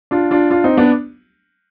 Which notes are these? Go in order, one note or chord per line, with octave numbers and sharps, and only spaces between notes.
D4 F4
D4 F4
D4 F4
C4 D#4
B3 D4